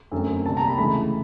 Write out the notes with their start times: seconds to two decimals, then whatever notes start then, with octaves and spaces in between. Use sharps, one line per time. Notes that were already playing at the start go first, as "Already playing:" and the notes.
0.11 F#2 D3 F#3 A3 C4
0.45 C2 A#2 G3 A5
0.57 A#5
0.67 B5
0.78 D2 C#3 E3 G#3 B5